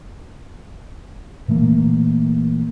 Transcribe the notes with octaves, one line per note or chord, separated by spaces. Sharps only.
A#2 E3 A3 A#3